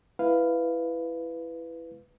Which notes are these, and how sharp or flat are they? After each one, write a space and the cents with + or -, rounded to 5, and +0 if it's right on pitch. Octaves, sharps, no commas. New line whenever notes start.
E4 +10 B4 +10 F5 +0